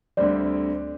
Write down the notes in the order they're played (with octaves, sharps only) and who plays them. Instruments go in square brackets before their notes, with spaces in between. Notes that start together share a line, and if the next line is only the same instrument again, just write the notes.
[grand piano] D2 D3 G3 C4 [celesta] D5